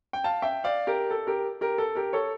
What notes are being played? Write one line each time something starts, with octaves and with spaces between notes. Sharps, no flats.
G5
F5 A5
E5 G5
D5 F5
G4 A#4
A4
G4 A#4
G4 A#4
A4
G4 A#4
A4 C#5